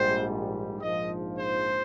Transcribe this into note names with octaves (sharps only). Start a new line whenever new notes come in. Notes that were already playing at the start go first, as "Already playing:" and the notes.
Already playing: A#1 G#2 G3 C5
A#1 G#2 F3 D#5
C5